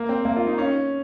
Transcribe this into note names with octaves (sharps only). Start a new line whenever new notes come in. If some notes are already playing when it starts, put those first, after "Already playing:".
Already playing: A#3
C4
A#3
F4
D#4
C#4